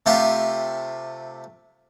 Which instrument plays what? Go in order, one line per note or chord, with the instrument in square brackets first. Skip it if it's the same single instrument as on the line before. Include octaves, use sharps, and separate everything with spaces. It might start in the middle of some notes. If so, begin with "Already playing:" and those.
[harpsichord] C3 A3 F4 G4